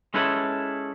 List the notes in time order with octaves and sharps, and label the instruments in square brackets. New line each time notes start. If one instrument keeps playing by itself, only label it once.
[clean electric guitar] G#3 C#4 E4 A4 B4